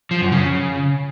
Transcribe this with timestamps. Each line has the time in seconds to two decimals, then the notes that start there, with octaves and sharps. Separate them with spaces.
0.11 F3
0.21 F#2
0.32 C#3